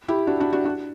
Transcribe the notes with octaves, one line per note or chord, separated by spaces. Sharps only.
E4 G4
D4 F#4
D4 F#4
D4 F#4
D4 F#4